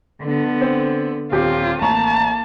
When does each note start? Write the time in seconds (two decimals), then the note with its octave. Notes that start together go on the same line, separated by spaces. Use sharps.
0.21 D3 B3
0.61 C4
1.32 D#1 C4 F4 G4
1.81 A1 A#3 A5 A#5 C#6